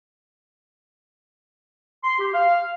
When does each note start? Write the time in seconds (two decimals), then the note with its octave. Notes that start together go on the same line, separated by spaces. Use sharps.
2.04 C6
2.19 G4
2.34 F5